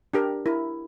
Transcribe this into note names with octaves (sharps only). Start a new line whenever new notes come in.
D4 G4 A#4
E4 A#4